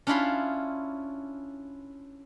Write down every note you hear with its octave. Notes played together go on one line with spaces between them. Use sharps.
C#4 D4 E4 F4 B5 C6